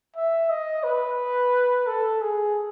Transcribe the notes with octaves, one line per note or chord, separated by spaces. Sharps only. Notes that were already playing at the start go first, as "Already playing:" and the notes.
E5
D#5
B4
A4
G#4